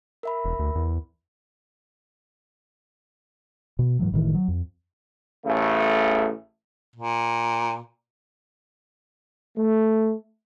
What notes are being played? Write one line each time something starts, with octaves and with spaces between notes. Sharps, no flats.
A#4 E5 B5
E1
D2
E2
B2
G#2 D#3 E3 F#3
F#1 A2 D#3 E3
F#3
F2
A1 C#3 A3
A#2
A3